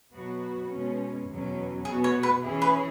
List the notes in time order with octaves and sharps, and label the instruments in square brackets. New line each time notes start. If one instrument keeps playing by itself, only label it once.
[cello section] B2 F#3 B3 F#4
B2 G#3 C#4
E2 B2 F#3 C#4
[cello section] B2 B3 F#4 [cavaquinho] G#4
[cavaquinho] C#5
B4
[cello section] E3 C#4 E4 G#4
[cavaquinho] B4